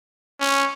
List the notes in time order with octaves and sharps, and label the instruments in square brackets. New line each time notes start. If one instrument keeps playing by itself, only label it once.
[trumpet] C#4